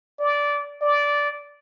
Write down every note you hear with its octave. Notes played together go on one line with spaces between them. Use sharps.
D5
D5